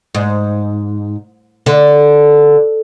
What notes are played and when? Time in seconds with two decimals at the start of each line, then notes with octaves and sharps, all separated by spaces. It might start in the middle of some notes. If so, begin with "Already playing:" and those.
0.15 G#2
1.66 D3